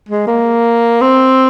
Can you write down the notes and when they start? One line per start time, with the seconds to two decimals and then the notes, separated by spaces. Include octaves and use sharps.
0.09 G#3
0.27 A#3
1.01 C4